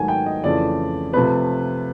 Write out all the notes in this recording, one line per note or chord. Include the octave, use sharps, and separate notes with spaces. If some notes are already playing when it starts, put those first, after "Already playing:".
Already playing: G#2 D#3 F#3 A3 G#5
G5
D#5
F2 C#3 E3 A3 D5
C3 F3 A3 C4 B4